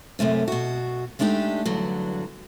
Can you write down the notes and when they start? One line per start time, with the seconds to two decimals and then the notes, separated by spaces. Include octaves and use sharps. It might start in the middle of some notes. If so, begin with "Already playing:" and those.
0.19 F#2 C3 A3 C#4
0.48 B2 F#4
1.19 G#3 A3 D4 D#4 G4
1.66 E2 G2 D3 F#3